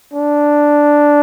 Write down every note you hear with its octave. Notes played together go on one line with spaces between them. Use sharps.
D4